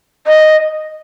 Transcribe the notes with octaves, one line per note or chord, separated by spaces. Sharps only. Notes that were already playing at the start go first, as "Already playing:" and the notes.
D#5